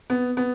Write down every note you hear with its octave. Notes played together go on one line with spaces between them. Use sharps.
B3
B3